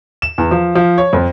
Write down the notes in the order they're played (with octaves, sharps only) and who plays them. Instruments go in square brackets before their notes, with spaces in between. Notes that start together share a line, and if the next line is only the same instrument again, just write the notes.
[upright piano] E7
E2
F3
F3
C#5
F2